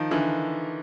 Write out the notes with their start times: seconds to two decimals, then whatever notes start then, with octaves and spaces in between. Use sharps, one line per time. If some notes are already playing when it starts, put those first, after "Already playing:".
Already playing: D#3 F3
0.11 D3 E3